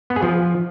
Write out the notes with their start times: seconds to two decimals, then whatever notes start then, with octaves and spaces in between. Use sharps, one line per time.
0.10 B3
0.16 G#4
0.22 F3